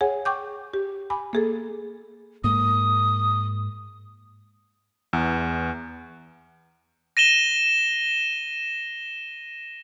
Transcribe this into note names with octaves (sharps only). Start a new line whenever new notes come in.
G#4 C#5 F#5 G#5
G5 C#6 D6 G6
G4
G#5 B5 D6
A#3 G#4 A4
G#2 A#3 D#6
E2
A#6 D#7 E7 G7